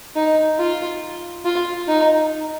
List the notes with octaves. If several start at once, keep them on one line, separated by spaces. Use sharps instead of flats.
D#4
F4
F4
D#4